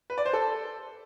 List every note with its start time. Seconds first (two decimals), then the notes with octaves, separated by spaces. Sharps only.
0.10 B4
0.18 D5
0.26 C5
0.33 A4